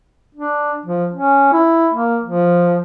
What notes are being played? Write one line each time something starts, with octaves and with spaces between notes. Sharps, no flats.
D4
F3
C#4
E4
A#3
F3